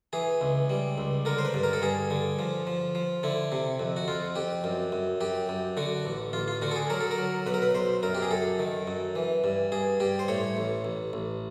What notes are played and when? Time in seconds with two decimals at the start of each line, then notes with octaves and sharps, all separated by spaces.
0.13 E3 G#4
0.41 C#2
0.70 G3
0.98 C#2
1.25 D3 A#4
1.38 C5
1.45 B4
1.54 G2
1.63 A#4
1.73 A4
1.82 G2 G#4
2.10 D3
2.39 F3
2.67 F3
2.95 F3
3.23 D3 E4
3.52 C3
3.79 F2
3.96 F#4
4.08 F2 F4
4.36 F2 G4
4.64 F#2
4.92 F#2
5.21 F#2 G4
5.49 F#2
5.77 D3 F#4
6.05 A1
6.33 A1 F4
6.48 F4
6.62 D3 F#4
6.71 A4
6.76 G#4
6.90 F#3 A#4
7.00 A4
7.11 A#4
7.18 F#3
7.46 B1 B4
7.54 A#4
7.62 B4
7.75 B1 C5
8.03 F#2 A#4
8.15 G4
8.22 G#4
8.31 F#2 A4
8.59 D#3
8.87 F#2
9.16 E3
9.44 G2
9.72 G2 G#4
10.00 G2 G4
10.19 C5
10.28 A2 C#5
10.57 A1
10.85 A1
11.13 A1